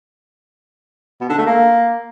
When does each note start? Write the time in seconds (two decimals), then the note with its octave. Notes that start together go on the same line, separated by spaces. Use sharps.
1.21 B2
1.29 D3
1.38 A3
1.46 A#3